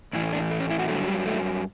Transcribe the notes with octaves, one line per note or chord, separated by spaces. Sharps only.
A2 E3 E4
D4
A3
C#4
E4
F#4
G2 D3 F#3 A3
G3
A3